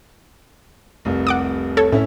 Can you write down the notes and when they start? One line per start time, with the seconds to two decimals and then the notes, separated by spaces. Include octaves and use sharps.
1.05 F1 C2
1.27 F#5 D6 D#6
1.77 A4 C#5
1.92 A2 C#4 E4